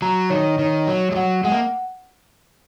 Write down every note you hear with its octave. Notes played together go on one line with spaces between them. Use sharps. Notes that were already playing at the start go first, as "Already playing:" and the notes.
F#3 A#5
D#3 C#5
D#3 C#5
F#3 C#5
G#3
F#3 F#5
G#3 F#5
A#3